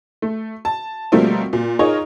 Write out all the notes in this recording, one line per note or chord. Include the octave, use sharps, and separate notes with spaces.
A3
A5
B2 F3 G3 A3 A#3 C4
A#2
D#4 F4 G#4 A#4 C#5 D#5